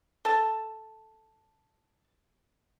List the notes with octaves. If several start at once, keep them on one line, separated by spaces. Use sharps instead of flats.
A4 A5